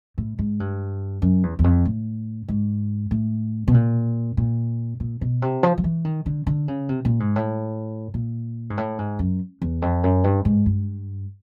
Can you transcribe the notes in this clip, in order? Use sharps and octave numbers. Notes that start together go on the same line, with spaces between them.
A2
G#2
G2
F#2
E2
E2
F2
A2
G#2
A2
B2
A#2
A#2
A#2
B2
C3
F3
F3
E3
D#3
D3
D3
C#3
C3
A#2
G#2
A2
A#2
G#2
A2
G#2
F#2
E2
F2
F#2
G2
G#2
G2